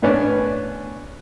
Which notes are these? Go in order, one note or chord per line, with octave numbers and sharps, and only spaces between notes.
A2 B3 C#4 D4